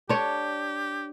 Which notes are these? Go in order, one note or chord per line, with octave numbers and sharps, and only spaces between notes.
D4 G4 C#5